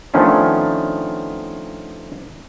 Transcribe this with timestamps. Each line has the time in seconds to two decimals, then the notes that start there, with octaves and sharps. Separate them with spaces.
0.14 D#3 F3 A3 B3 C#4 D4